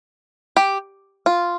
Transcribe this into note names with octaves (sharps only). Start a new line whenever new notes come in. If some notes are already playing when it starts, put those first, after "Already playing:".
G4
F4